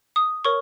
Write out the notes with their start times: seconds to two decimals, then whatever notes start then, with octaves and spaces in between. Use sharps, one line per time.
0.16 D#6
0.45 A#4 C#5 C#6